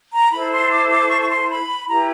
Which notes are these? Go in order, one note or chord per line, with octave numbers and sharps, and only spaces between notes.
A#5
E4 A4 C5 B5
C6
D6
D6
C#6
C#6
C6
B5
E4 G4 B4 A#5